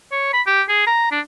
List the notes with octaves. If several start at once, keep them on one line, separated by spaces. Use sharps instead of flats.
C#5
B5
G4
G#4
A#5
D4